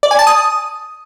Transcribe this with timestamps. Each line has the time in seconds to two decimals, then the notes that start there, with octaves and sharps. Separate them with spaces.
0.03 D5
0.11 G#5
0.19 A5
0.27 D#6